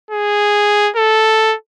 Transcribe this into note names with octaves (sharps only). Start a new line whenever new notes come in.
G#4
A4